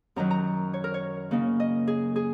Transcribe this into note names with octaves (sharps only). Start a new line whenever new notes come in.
F#2 D#3 F#3 A#5
A#5
C#5
A#4
C#5
C#3 A#3 D#4
D#5
G#4
G#4